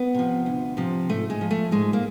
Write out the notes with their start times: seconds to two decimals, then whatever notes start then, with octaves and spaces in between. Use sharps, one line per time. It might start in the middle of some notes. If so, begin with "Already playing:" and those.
Already playing: B3
0.14 C3 F3
0.46 D2
0.77 C3 F3
1.09 G#2 A3
1.30 G#3
1.41 F3
1.51 A3
1.71 G#2 G#3
1.93 A#3